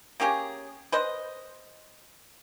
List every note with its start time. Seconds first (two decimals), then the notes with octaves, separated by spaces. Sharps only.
0.20 A#3 C#4 G4 G#4
0.92 B4 C5 D#5